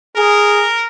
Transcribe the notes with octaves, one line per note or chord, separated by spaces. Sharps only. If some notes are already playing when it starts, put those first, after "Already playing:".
G#4 A#4